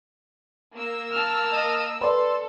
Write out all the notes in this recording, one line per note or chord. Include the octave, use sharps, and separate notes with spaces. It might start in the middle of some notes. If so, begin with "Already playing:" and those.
A#3 E6
A5 F6
D#5
A4 B4 D5 C6